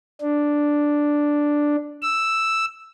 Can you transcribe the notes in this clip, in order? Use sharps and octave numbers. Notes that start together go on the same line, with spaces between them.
D4
E6